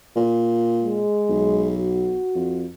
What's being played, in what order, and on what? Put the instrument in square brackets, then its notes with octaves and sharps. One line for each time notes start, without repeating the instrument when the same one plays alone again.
[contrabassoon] A#2
[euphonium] G#3
[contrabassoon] B1
[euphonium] F#4
[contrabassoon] F2